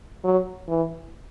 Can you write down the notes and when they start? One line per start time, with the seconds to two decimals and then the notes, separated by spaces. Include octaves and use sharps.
0.24 F#3
0.68 E3